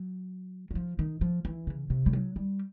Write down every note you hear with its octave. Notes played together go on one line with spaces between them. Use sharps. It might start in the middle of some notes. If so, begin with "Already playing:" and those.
Already playing: F#3
F#3
F3
D#3
F3
E3
C#3
C3
G3
F#3
G3